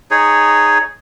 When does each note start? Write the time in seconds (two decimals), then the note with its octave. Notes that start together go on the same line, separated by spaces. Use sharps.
0.11 D#4 G#4 C#5